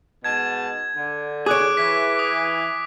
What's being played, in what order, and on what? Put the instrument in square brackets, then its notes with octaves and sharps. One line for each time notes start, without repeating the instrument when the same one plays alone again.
[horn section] G#2 B2 A5 [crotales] G#6
[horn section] D3
[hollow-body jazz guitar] G#4 C#5 [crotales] D6 F#6 D7
[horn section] E3 [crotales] B6
[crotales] D#6